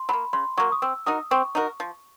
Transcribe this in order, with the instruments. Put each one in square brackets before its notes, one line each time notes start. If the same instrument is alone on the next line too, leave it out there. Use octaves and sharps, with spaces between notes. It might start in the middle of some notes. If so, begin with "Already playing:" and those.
Already playing: [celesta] C6
[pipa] F#3 A#3 [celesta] B5
[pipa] C#3 [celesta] C6
[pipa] F#3 A#3 [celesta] C#6
[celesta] D#6
[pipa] C4 [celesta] E6
[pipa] D#4 F#4 A#4 [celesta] D#6
[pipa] C4 [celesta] C#6
[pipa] D#4 F#4 A#4
F3